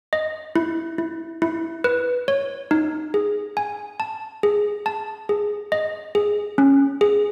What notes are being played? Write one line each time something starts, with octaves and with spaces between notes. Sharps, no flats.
D#5
E4
E4
E4
B4
C#5
D#4
G#4
G#5
A5
G#4
A5
G#4
D#5
G#4
C#4
G#4